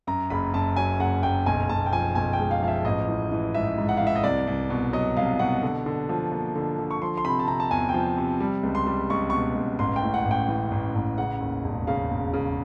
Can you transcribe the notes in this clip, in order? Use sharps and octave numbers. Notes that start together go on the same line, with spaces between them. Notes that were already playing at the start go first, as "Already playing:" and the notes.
F#2 A#5
F#1 B5
F#2 A5
F#3 G#5
F#1 F#5
F#1 G5
B1 G#5
B1 A5
G5
F3 G#5
B1 G#5
G5
G#3
F5
F3 F5
E5
A1 D#5
E3
E3
G#2 E5
G#2
F#5
E3 F5
E5
D#5
C2 D5
C2
B2
F#3 D#5
C2 F5
B2 F#5
D3
D3
F3
A#3
D3
D3
C#6
F3 C6
C6
C3 B5
A5
C3 A#5
A5
E2 G#5
G5
F3
C3
G3
C#2
C6
G3
C#2 C#6
B2 C#6
C#2
A1 C6
G5
A2
F#5
A1
G5
E3
A1
A1
C#3 F#5
D#2
E1
C#3 F5
E1
C#3